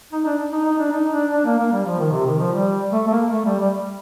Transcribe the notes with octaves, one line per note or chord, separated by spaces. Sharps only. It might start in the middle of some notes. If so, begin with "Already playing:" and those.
D#4
D4
D#4
D#4
D4
D#4
D4
D4
A#3
A#3
G3
F3
D#3
C3
D#3
F3
G3
A3
A3
A#3
A3
G3
G3